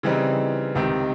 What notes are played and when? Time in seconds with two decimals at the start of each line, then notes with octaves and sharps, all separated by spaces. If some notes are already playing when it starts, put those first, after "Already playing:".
0.03 C#3 E3 G3 C4 D#4
0.75 C#2 C3 D#3